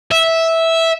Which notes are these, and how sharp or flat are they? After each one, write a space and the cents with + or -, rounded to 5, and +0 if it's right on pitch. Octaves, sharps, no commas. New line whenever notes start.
E5 -10